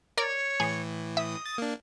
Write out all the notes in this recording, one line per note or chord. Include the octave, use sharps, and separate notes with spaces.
A#4 C#5 D5
A2 E3 G#4
E5 D#6
A6
A#3 D4